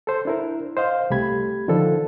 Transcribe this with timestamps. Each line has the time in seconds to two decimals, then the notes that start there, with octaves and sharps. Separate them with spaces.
0.07 A4 C5
0.25 D4 E4 A#4
0.77 C5 D#5 F5
1.10 C2 A3 G4 B5 G#6
1.68 D3 D#3 F3 D4 A4